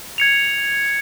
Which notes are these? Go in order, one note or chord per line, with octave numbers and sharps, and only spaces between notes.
G#6 C#7 F7